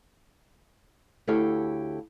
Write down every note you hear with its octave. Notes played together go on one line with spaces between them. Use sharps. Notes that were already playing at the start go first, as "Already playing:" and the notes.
D2 E4 G4 A4 C#5 F5